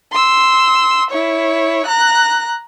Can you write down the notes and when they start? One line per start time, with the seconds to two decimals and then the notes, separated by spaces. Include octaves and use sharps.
0.12 C6 E6
1.10 E4 C#5
1.86 A#5 F#6